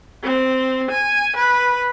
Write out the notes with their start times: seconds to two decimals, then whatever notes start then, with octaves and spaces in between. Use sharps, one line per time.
0.23 C4
0.91 G#5
1.36 B4